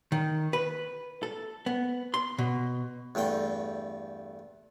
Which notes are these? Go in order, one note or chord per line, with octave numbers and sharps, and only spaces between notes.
D#3
B4
A4
B3
C6
B2
E2 G2 A3 G5